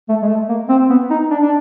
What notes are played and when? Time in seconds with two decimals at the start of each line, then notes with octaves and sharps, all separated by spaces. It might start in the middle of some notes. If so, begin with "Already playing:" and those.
0.09 A3
0.22 G#3
0.28 A3
0.49 A#3
0.69 C4
0.89 B3
1.10 D#4
1.31 D4
1.42 D4